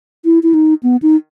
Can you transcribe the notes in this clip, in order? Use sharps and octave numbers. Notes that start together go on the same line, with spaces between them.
E4
E4
D#4
B3
D#4